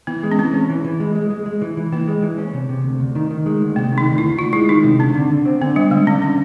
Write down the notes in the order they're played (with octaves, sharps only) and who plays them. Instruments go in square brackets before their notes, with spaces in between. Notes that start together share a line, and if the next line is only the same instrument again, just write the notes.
[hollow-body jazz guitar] E3 [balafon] B3
[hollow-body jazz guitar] G#3
[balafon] C#4
[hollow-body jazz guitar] E3 [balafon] C4
[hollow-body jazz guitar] C#4
E3
E3
G#3
G#3
G#3
G#3
E3
E3
[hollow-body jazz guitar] E3 [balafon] A#3
[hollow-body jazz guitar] G#3
E3
C#4
C3
C3
D2
D2
D#3
D#3
G#3
D2
[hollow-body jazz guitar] C3 [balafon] A#3
[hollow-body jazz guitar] D#3
[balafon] D#4
[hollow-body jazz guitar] D2
[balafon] E4
[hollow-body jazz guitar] D2
[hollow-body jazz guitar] D2 [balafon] F4
[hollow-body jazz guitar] G#3 [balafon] E4
[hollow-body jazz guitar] D#3 [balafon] D#4
[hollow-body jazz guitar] C3
[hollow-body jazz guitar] D3 [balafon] C4
[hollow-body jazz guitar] D3
D3
C4
[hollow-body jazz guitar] D3 [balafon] B3
[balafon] G3 [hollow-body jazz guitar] C4
[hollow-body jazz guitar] D3 [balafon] G#3
[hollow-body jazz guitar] D3 [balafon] C#4
[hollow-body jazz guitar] D3 [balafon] C#4